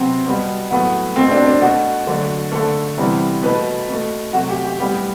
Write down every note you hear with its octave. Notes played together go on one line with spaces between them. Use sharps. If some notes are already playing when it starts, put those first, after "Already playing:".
Already playing: C3 F#3 B3 C4
B2 G3 B3
A2 F#3 A3 B3
B2 A3 C4
C4
D4
D4
B2 A3 F#4
D3 F#3 A3
D3 A3 A4
C3 E3 G3 B3
B2 A3 B4
B2 A3
C3 F#3 A3 F#4
G4
G4
A2 G3 B3 G4